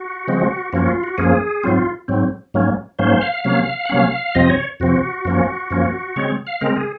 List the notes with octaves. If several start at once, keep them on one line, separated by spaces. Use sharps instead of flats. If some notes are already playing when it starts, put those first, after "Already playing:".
Already playing: F#4
C#3 F3 G#3 C4
F#2 F3 A#3 C#4 F#4
F4
F#4
F#2 F3 A#3 C#4 G#4
G#2 F#3 C4 F4
G#2 F#3 C4
G#2 F#3 A#3 C#4
G#2 F#3 A#3 C#4 C5
F5
C3 F#3 A#3 C#4 F5
F#5
C3 F#3 A#3 C#4 F5
F2 C3 F3 C4 D#5
C#5
F2 C3 F3 C4 F#4
F#2 F3 A#3 C#4
F#2 F3 A#3 C#4
C#3 G#3 C4 C#5
F5
C#3 G#3 C4 A#4
G#4